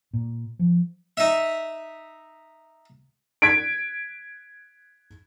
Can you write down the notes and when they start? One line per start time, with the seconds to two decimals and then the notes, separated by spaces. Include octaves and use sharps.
0.13 A#2
0.59 F3
1.17 D#4 E5
3.42 G#6 B6 D7